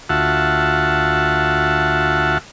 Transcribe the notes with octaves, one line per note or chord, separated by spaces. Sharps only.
D2 F4 F#4 E5 F#5 A5